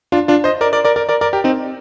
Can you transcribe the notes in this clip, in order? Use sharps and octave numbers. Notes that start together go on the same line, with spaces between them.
D4 F4
D4 F4
C5 D#5
A#4 D5
A#4 D5
A#4 D5
A#4 D5
A#4 D5
A#4 D5
G4 A#4
C4 D#4